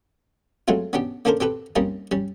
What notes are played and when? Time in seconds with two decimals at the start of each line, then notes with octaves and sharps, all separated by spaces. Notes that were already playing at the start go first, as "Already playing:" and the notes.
0.68 F#3 G#3 A3 C4 F4
0.93 B3 C#4 D4 G4
1.25 A#3 C#4 D4 A4 A#4 C5
1.41 C4 G4 A4 B4
1.76 G3 A#3 C4 C#4 D#4
2.12 G3 C#4